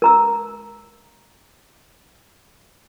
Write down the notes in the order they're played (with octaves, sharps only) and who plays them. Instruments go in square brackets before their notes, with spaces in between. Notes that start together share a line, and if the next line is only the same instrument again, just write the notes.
[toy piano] A#4 A#5 E6